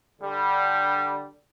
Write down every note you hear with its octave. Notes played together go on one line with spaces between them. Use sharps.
D3 G3